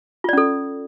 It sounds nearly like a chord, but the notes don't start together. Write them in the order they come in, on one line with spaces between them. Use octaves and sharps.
F4 D5 C#4 A4